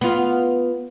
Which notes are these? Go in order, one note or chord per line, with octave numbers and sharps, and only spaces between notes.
B3 F4